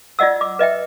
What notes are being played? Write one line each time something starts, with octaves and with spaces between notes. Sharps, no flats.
F4 D5 D#5 F#5 E6
D6
B4 D#5 E5 G5